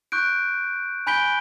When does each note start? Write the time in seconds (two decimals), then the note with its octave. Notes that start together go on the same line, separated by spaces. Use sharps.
0.12 C#6 F#6 G6 D7
1.07 G#5 B5 G6 B6 D7 G7